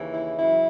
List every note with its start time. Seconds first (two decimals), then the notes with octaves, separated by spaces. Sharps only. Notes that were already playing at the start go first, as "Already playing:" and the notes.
Already playing: D#2 C#3 E3
0.13 E4
0.39 F#2 C#3 E3 E4